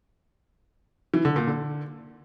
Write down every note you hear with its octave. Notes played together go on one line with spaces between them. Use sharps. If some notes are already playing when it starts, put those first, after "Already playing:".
E3
D3
A#2
D3